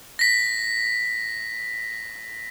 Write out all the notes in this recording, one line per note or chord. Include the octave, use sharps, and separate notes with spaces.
A#6 B6